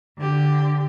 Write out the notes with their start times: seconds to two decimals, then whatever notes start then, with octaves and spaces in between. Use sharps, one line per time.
0.18 D3 G4